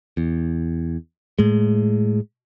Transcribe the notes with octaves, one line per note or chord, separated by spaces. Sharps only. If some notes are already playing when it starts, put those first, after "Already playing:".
E2
A2 G#3